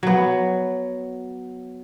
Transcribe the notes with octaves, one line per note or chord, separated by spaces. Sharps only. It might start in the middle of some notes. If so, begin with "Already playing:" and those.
F#3 B3